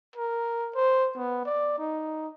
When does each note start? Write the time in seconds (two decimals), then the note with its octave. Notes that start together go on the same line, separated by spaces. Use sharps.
0.16 A#4
0.75 C5
1.16 B3
1.45 D5
1.78 D#4